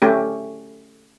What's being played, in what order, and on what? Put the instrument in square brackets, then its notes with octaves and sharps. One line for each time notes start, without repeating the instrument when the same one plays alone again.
[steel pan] A3 C#4 G4